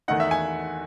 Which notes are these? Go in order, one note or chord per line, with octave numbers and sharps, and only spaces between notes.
E2 D#3 A3 D#4 F#5
E5
G#5